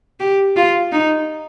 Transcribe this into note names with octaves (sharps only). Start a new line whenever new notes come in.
G4
F4
D#4